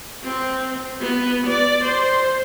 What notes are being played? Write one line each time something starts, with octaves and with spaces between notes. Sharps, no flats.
C4
B3
D5
C5